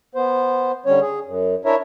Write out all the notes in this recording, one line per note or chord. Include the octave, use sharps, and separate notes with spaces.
B3 C5
D3 G3 C#4 C#5
G#4
F#2
D4 E4 A#4 C#5 E5